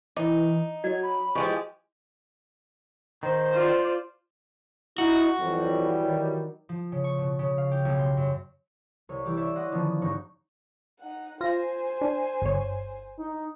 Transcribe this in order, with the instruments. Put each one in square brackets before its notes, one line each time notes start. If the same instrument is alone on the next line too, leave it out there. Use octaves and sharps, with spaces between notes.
[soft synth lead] E3 [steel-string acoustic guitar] D#4 [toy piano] D6
[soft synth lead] F#3 [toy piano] F#4 D#5 [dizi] G#6
[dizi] B5
[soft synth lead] E3 [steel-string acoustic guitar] F3 G#3 G4 [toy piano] D#5 C#6
[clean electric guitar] D#3 [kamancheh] C5
[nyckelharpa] F4 D5
[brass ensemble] D#4 [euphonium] E4 [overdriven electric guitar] F#4
[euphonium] F2 [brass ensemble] E3 F#3 G3
[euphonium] D#3
[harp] F3
C#3
C#6
B2
C#3
F5
G4
B1
C6
F#2
C2 C#5
E3 G3 E4 G4
C#5 D5 E5
D#5 F#5 C6 D6
D3 D#3 F3 B3 C#4
E1 G2 D#4 C#6 F#6 C#7
[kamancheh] D#4 F#5
[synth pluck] F4 A#6 [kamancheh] C5 G#5
[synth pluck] D4
G1 C#5
[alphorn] D#4